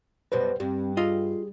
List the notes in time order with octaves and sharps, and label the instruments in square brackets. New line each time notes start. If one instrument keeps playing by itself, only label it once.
[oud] F#2 B2 G3 [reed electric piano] B4 C5
[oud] G2 [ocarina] C4 [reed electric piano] G4
[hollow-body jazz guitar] F4 D#5 [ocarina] G#4